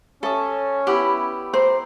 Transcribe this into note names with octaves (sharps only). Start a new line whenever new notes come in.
C#4 A4 C#5 E5 G#5 D#6
B3 E4 G4 D5 F#5 B5
A#4 C5 D5